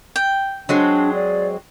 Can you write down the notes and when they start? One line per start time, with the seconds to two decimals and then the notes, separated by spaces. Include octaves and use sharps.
0.16 G5
0.69 F#3 G#3 C4 D4
1.14 D5